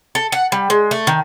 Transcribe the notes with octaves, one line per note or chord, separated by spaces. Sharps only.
A4
F#5
G3
G#3
A3
D#3